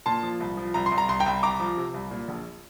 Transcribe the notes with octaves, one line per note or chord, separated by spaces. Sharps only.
A#2 A5 C6
F3
C2
F3
C2 A#5
C6
C2
A#5
C2 C6
G5 A#5
C2
C2 A#5 D6
F3
C3
C2
A#2
A#1